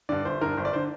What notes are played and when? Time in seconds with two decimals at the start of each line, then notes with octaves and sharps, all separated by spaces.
0.09 G2 D3 D5
0.25 G1 C5
0.41 G2 D3 A#4
0.57 G1 C5
0.65 D5
0.73 D3 C5